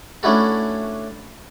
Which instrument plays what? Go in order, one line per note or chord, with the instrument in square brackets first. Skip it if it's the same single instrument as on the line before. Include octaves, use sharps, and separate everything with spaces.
[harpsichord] A3 C#4 D4 E4 F#4 A4